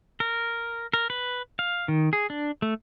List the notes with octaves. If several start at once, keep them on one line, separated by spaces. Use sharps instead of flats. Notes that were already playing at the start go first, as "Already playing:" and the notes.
A#4
A#4
B4
F5
D#3
G#4
D4
A3